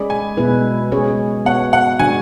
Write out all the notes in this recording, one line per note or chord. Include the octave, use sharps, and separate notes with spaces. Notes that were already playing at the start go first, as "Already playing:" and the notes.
Already playing: G#3 C#4 G#4 D5 B5
G#5
B2 G#3 B3 E4 B4
G#3 C#4 G#4 C#5
B3 F#4 C#5 F#5
F#5
D3 G#3 D4 F#4 G#5